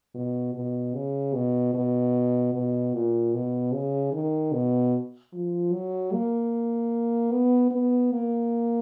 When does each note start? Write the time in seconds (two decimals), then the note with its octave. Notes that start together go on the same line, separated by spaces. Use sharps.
0.15 B2
0.54 B2
0.94 C#3
1.34 B2
1.74 B2
2.54 B2
2.94 A#2
3.33 B2
3.73 C#3
4.13 D#3
4.53 B2
5.33 F3
5.73 F#3
6.13 A#3
7.32 B3
7.71 B3
8.12 A#3